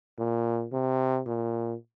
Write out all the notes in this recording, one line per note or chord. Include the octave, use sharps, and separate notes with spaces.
A#2
C3
A#2